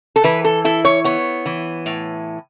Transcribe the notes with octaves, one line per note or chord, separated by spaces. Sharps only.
A4
E3 B4
A4
E4 A4
C#5
B3 C#5
E3
A2